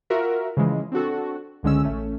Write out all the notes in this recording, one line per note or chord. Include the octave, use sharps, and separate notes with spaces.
F4 F#4 A#4 E5
C#3 E3 F3 G#3
C4 D4 F#4 A4
C#2 D3 G#3 C#4 E6
A1 A3 C#4